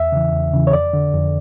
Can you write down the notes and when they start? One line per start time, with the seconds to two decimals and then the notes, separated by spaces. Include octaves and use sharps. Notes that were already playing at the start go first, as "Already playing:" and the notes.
Already playing: E2 E5
0.12 C#3 E3
0.32 E2
0.53 C#3 E3
0.67 C#5
0.73 F2 D5
0.93 D3
1.14 F2